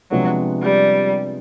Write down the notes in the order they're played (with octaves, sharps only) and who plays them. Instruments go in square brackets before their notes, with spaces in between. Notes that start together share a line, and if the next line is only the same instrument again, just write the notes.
[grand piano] C3 F3 G#3 B3 D4 [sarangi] F#3
[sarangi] G3